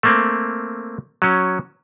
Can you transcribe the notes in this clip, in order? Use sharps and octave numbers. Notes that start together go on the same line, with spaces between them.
A3 A#3 C4
F#3 C#4